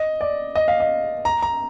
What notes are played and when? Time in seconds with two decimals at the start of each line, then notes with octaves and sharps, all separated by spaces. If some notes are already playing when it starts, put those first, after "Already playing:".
Already playing: D#5
0.21 D5
0.55 D#5
0.68 F5
0.80 D#5
1.25 A#5
1.42 A#5